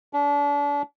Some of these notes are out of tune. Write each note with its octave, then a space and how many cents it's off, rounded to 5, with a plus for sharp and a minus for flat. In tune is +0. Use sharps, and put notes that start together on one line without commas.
D4 -35